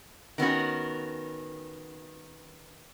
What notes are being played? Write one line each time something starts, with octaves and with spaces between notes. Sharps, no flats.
D#3 B3 C#4 F#4